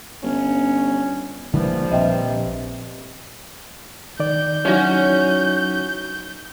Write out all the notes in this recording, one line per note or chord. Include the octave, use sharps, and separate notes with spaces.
G1 C#4
G2 D3 E3 F3 G3 A#3
A#1 C3 D#5 E5 G5
D#3 D5 G6
F#3 C#4 D#4 E4 F#4